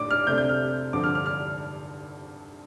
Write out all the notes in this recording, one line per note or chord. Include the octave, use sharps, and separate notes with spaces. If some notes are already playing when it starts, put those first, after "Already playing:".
Already playing: A2 D4 D6
F6
C3 A3 D4 G6
G6
F6
G2 D3 F3 D6
F6
F6
F6